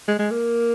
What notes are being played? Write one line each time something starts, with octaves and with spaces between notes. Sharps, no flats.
G#3
G#3
A#3